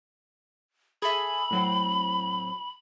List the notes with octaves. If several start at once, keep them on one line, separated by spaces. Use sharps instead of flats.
G#4 A4 E5 B5
A2 F#3 C4